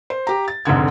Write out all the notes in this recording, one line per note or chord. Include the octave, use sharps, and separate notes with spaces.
C5
G4 A#5
A6
F1 G#2 D3 G#6